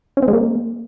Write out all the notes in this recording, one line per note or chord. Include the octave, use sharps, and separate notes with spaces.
C#4
C4
G#3
A#3